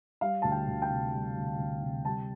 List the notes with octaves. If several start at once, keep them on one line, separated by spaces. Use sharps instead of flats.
G3 F5
D2 A5
G5
D2
G5
C3
G3
D2
D2
C3
G3 A5